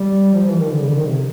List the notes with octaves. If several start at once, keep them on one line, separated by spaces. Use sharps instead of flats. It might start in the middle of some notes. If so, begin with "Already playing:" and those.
Already playing: G3
F3
E3
D#3
D3
C#3
D3
D#3
C3